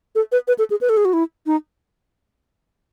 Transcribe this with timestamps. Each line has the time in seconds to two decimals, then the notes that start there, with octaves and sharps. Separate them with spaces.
0.15 A4
0.32 B4
0.48 B4
0.59 A4
0.70 G#4
0.81 B4
0.89 A4
0.97 G#4
1.05 F#4
1.13 E4
1.46 D#4